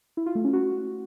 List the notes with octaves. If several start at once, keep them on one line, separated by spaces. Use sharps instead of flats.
E4
F4
A3
C#4
F#4